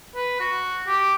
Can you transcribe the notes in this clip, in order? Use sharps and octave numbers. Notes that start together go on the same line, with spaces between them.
B4
F#4
G4